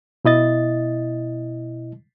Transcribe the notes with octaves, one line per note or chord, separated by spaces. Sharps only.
B2 E4 D#5 A6